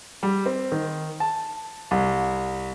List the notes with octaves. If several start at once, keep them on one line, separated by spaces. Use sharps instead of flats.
G3
C4
D#3
A5
C2